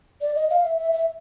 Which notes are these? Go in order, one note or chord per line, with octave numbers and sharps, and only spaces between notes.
D5
D#5
F5
E5
E5
E5